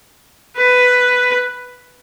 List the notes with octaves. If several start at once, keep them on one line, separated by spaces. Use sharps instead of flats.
B4